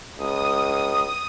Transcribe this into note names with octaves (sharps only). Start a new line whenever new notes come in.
C#2 D#6